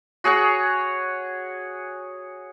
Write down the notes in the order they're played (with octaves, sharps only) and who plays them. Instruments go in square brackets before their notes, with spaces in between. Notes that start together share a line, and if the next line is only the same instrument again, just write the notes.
[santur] F#4 G#4 C#5 F#5